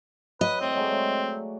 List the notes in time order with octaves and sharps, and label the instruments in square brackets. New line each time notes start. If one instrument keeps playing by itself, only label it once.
[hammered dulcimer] F#3 [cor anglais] B4 [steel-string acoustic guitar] D#5
[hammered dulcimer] A2 D5 G5 [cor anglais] C4
[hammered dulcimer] F#3 G#3 A3
A3